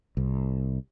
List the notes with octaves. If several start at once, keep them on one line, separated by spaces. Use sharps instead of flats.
C2